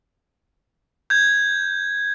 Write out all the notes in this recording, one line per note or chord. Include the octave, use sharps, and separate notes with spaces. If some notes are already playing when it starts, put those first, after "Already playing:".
G6 G#6